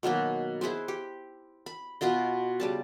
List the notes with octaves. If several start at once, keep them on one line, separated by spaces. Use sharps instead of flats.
B2 D#3 F#3 A#3
E4 G#4 B4 C5
G4
B5
B2 B3 F4 D#5
C#3 G3 A5